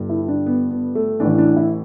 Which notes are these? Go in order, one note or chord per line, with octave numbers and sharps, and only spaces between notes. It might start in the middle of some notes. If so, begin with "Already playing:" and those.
Already playing: G1 G2 D3
E4
D4
B3
B3
A3
A1 A2 E3 D4
D4
E4